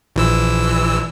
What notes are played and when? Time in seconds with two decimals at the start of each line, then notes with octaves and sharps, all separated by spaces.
0.16 A#1 E3 E6